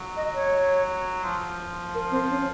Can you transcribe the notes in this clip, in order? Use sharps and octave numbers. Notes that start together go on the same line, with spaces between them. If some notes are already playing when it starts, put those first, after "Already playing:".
Already playing: F#3
D#5
C#5
F3
A#4
C4
C#4